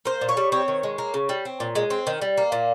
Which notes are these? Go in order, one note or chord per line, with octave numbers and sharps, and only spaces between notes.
A#3 C5
A#2
C#5
G3
C4 C#5
D#3
G#3
A#3
C#3
G3
C4
A#2
G#3
C4
D#3
G3
A#3
A#2